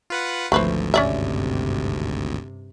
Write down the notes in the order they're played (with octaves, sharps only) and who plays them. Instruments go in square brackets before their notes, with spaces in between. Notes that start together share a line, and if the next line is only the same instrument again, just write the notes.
[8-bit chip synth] F4 B4 F#5
[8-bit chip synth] G#1 D2 [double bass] F3 [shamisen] A3 B4 C5
[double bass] G2 C3 [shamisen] C#4 D5 E5